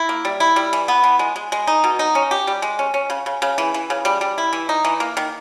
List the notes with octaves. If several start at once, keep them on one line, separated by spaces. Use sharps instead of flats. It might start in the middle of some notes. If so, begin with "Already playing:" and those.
Already playing: E4
A#3
G3
E4
G3
E3
B3
E3
G#3
G#3
G#3
D#4
B2
D#4
C#4
G4
G3
G#3
C#4
C#4
C#3
C#3
C#3
E3
E3
C#3
G3
G3
E4
E3
D#4
E3
A#3
D#3